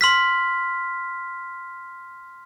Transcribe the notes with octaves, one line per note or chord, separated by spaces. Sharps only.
C6 F6 B6